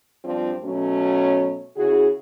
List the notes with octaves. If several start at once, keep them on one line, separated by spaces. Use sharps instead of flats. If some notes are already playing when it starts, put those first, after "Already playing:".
G2 F3 C4 D4 F4
B2 F#3 A3 C#4
C#3 E4 F#4 G#4